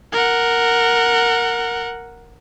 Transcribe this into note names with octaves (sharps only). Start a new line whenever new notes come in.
A#4 F#5